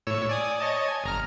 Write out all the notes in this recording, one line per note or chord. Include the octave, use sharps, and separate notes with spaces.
A2 C#5 E6
D5 G#5 D#6
C#5 D#5 A5
G#5
G1 A#5 F6